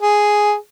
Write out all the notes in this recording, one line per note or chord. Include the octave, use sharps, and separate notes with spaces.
G#4